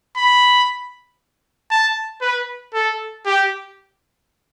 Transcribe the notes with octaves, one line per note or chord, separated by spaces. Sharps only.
B5
A5
B4
A4
G4